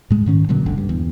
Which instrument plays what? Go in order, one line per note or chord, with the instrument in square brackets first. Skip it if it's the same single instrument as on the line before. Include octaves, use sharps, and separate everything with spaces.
[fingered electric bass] A2 G#3
G#2 D#3 C#4
B2 D3 F#3 A#3
F#1 C2 D3
G2
E2